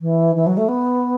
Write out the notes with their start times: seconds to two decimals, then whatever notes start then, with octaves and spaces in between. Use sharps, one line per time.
0.01 E3
0.35 E3
0.47 F#3
0.57 A3
0.68 B3